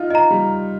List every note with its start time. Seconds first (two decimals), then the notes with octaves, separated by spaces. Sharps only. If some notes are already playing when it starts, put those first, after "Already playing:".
Already playing: D#4 F4
0.10 D#4 D#5 A#5
0.31 G3